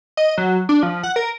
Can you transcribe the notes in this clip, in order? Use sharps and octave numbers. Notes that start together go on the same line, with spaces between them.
D#5
F#3
D4
F3
F#5
A#4